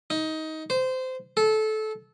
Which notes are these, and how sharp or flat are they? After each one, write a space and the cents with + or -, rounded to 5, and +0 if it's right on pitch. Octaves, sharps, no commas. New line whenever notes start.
D#4 +20
C5 -20
A4 -20